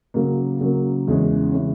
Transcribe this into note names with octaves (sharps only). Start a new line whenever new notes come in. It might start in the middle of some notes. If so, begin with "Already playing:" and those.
C#3 F#3 A#3
C#3 F#3 A#3
E2 C#3 E3 G#3 C#4
C#3 E3 G#3 C#4